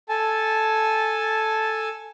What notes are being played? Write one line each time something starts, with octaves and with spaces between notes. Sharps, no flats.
A4 G#5 A5